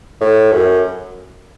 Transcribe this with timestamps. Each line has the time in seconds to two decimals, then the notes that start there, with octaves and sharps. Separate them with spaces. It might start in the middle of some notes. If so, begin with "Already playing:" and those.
0.21 A2
0.52 F#2